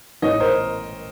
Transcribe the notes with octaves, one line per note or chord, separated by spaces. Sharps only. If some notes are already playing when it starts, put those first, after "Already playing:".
A1 C#5 D#5
A#4 C5